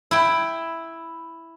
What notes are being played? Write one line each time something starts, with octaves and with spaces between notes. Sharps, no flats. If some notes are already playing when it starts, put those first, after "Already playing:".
E4 G5